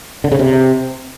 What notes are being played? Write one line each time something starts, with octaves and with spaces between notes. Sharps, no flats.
D3
C#3
C3